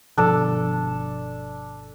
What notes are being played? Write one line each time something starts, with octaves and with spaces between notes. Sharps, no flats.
G1 B2 F3 D4 A4